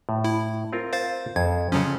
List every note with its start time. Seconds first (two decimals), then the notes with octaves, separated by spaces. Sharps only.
0.09 A2
0.24 E4
0.73 C4 F4 A#4
0.93 C5 F5 A6
1.36 F2 G#6
1.72 C#3 F3 F#3 C#4 C#5 F#5